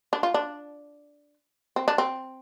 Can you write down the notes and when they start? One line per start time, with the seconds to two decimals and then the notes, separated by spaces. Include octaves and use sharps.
0.13 D4
0.23 F4
0.34 D4
1.76 C4
1.88 D4
1.98 C4